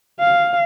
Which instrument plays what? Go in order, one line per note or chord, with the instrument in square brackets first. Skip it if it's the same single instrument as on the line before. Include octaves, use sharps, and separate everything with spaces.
[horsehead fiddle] F5